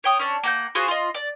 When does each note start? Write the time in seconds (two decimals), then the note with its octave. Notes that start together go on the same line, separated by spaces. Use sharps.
0.04 C#5 G5 D#6
0.19 C#4 D4
0.43 A#3 F#5 G6
0.75 F4 F#4 G#4 C5
0.88 F4 D#5
1.14 D5